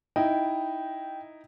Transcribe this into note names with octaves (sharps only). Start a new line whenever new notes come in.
D#4 E4 D#5 G5